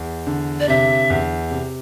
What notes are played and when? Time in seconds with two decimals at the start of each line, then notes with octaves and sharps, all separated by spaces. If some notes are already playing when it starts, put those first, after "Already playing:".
Already playing: E2
0.27 D3
0.60 D5
0.68 C3 E5
1.10 E2
1.51 C3